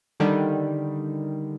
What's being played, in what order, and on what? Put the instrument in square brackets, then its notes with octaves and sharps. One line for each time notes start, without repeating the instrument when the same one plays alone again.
[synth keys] D3 D#3 G3